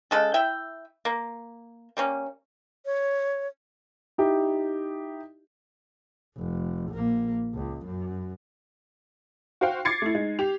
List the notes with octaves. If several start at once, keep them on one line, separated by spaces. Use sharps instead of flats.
C#3 G#3 A4
E4 E5 G5
A#3
G3 A#3 C#4
C#5
D#4 E4 G4
F1
A#1 A#3
C#2
F#2
F#4 C5 F5 G5
D6 G#6 A6 C7 C#7
A3 E4
G#3 D#4
G4 F7